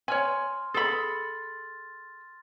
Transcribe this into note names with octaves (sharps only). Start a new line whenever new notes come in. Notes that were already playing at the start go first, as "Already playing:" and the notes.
C#5 G#5 C6 F6
G#4 A4 B5 A6